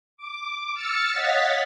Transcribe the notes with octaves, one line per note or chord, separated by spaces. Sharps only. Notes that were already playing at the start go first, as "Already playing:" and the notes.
D6
E6 F6 A6 C#7
C#5 D#5 F5 F#5 A6 B6